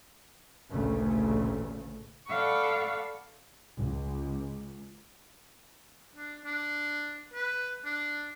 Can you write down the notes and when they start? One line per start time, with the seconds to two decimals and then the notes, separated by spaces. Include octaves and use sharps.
0.70 A1 D2 A#2 C#3 A3
2.28 A4 D5 F5 F#5 B5 C#6
3.77 C#2
6.16 D4
6.45 D4
7.34 B4
7.85 D4